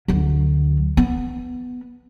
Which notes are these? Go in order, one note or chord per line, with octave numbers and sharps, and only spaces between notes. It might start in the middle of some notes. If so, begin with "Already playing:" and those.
D2 F#3
B3